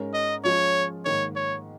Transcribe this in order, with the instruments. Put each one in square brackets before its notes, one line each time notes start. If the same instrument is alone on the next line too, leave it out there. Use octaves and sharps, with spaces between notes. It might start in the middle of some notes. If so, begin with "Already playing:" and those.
Already playing: [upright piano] G#2 G#3 C#4 A#4
[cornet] D#5
[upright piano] F3 G#3 C#4 F4 [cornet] C#5
[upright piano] G#2 D#3 A#3 [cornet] C#5
[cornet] C#5